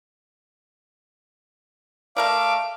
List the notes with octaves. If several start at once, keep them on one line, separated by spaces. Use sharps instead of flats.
A3 A#4 D5 F5 D6